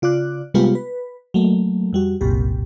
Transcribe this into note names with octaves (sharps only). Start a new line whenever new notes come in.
C#3 F4 D5 D6 F#6
C3 G3 G#3 B3 F4 G4
B4
F#3 A3 A#3
F2 G3 F#4
G1 C2 F#2 A#2 G4